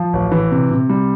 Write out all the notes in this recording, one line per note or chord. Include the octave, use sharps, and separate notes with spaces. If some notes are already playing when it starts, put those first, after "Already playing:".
Already playing: F3
A1
E3
C3
C3
G3